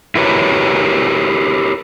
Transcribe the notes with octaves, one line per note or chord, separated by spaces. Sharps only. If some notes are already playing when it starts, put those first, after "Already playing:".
E4 F#4 G4 A#4 B4 C#5